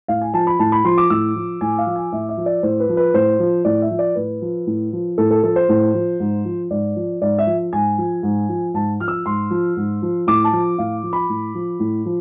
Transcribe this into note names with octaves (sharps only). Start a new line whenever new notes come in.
A2 F5
G#5
F3 A5
B5
A2 A5
B5
F3 C6
D6
A2 E6
F3
A2 G#5
F5
F3
G#5
A2 E5
E5
F3
D5
A2 C5
B4
F3
B4
A2 C5
F3
A2 D5
E5
F3
D5
A2 B4
F3
A2
F3
A2 A4
A4
F3 A4
C5
A2
F3
G#2
F3
G#2 D5
F3
G#2 D5
E5
F3
G#2 G#5
F3
G#2
F3
G#2 A5
F3 F6
E6
G#2 C6
F3
G#2
F3
A2 D6
A5
F3
A2 F5
F3
B5
A2
F3
A2
F3